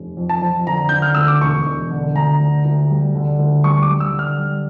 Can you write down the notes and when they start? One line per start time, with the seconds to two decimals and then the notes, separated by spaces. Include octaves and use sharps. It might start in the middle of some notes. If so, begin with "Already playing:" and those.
Already playing: F1
0.17 F2
0.29 A5
0.42 F2
0.67 D3 A#5
0.89 D3 G6
1.02 F6
1.15 D2 E6
1.28 D6
1.41 E1 C#6
1.66 E1
1.90 D3
2.15 D2 A#5
2.40 D3
2.65 D2
2.90 G3
3.15 D3
3.39 D2
3.64 G3 C#6
3.82 D6
3.88 G3
4.00 E6
4.13 D3
4.19 F6
4.38 G3